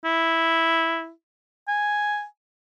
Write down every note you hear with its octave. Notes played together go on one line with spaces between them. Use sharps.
E4
G#5